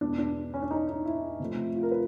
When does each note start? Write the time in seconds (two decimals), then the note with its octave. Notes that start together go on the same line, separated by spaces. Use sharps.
0.01 E2 B2 G#3 D4
0.19 D4
0.54 C#4
0.62 D4
0.71 D#4
0.88 D#4
1.05 E4
1.40 C3 F3 A3
1.75 F4
1.83 A#4
1.92 B4